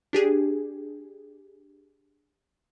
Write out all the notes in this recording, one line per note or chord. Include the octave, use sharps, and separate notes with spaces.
D4 G4 G#4